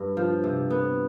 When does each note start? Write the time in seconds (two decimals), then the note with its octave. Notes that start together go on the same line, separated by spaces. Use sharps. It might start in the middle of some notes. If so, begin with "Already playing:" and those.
Already playing: G2
0.17 F3
0.44 C3
0.70 B3